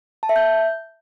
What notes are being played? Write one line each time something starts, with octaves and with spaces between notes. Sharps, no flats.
A5
E5
G6